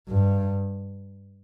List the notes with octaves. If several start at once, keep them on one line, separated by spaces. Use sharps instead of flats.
G2